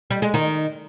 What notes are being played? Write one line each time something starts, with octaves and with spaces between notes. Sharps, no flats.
G3
G#3
D#3